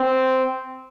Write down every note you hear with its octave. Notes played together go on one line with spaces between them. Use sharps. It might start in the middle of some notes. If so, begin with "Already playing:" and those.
Already playing: C4